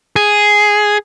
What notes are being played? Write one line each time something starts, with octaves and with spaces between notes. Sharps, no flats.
G#4